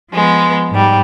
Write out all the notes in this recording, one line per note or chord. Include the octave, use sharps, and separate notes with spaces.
F3 G#3 B3
G#2 G3